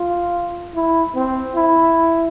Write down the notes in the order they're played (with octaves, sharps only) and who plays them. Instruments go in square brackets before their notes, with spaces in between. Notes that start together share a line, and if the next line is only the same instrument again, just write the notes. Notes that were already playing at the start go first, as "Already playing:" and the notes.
Already playing: [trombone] F4
E4
C4
E4